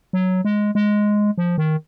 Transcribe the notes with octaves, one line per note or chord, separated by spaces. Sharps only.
F#3
G#3
G#3
F3
D#3